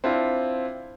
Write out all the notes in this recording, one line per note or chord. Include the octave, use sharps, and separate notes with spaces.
C4 D4 E4 F4